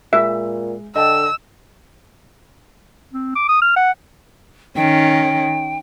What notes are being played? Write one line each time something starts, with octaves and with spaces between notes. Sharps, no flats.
A#2 G#3 E5
D3 D#5 G5 A5 E6
C4
D6
D#6
F6
F#5
D#3 C#4 G5